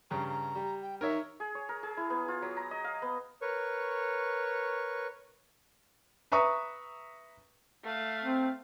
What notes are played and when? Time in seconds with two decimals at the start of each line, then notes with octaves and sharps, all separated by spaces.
0.11 G2 C#3 A#5
0.29 A#5
0.55 G3
0.82 G5
1.01 D#4 A#4 C#5 E5
1.40 G#4
1.55 C#5
1.69 A#4
1.83 G#4
1.97 E4
2.10 B3
2.28 F4
2.42 F#3
2.57 A#5
2.71 D#5
2.84 F5
3.02 B3
3.41 A#4 B4 C#5 C#6
6.32 B4 E5 A#5 C#6 D#6
7.85 A3 F5
8.22 C4